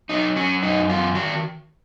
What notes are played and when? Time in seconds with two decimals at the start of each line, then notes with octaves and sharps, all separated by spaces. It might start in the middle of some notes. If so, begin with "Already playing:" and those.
0.09 F#3 D#4
0.36 F#3 C#4
0.62 F#2 D#4
0.89 F#2 F4
1.15 D#3 F#4